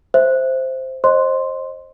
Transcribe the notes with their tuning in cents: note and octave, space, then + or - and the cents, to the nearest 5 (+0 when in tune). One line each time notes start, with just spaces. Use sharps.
C5 +0 E5 +0
C5 +20 D#5 -15 C6 +0